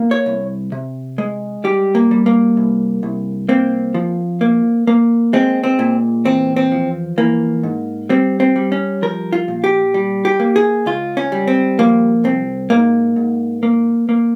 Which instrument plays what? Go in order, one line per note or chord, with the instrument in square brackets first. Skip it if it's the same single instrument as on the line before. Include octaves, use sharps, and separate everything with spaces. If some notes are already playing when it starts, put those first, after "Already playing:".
Already playing: [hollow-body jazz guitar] A#3
C#5
C2
C3
G#3
G3 G4
A#3
G3
A#3
C2
C2
A#3 C4
F3
A#3
A#3
G#3 C4
C4
A#2
E2 C4
C4
F3
E3 A#3
G#2
G3 C4
C4
G3
C#4
F3 A#4
F4
A#2
G4
G3
G4
A#3
G#4
C#2 F4
C#4
G3
C4
F3 A#3
C2 C4
G#2 A#3
G#2
A#3
A#3